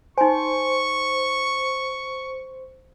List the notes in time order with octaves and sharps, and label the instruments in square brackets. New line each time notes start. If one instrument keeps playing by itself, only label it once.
[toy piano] D#4 G#5 [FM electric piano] C5 [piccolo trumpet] C#6